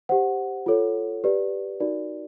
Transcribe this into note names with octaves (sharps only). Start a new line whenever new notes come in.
G4 C5 F#5
F4 A4 C#5
G4 B4 D5
D#4 F#4 A#4 D5